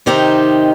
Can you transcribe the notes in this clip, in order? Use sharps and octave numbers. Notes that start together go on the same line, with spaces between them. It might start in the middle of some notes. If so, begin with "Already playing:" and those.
C3 D#3 C4 D#4 G4